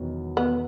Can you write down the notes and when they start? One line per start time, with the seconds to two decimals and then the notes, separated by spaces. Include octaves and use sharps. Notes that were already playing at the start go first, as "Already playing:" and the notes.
Already playing: E1 E2 D#3 F#3
0.37 B3